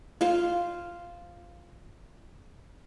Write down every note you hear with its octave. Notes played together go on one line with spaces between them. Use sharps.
F4 C5 F5